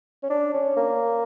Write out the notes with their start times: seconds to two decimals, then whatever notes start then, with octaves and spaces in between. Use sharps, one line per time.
0.23 C#4
0.30 D4
0.54 C#4
0.77 A#3